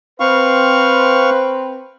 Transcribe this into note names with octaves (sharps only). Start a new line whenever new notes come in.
C4 B4 F5 C#6